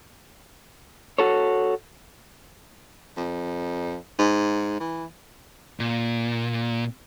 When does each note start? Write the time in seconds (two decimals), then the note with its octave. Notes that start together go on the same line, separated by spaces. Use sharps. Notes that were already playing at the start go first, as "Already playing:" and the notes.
1.18 F#4 A4 C#5
3.17 F2
4.19 G#2
4.80 E3
5.80 A#2